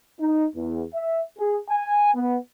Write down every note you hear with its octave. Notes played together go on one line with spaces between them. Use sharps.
D#4
E2
E5
G#4
G#5
B3